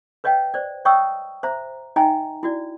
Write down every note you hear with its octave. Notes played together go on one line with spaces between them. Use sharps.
B4 C#5 D#5 F5 G5
C5 D5
C#5 D#5 G5 C#6 D#6 E6
C5 E5 A#5
D#4 D#5 E5 G5 G#5 A#5
E4 F#4 D5